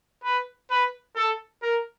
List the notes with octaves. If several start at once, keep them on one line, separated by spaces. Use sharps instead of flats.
B4
B4
A4
A#4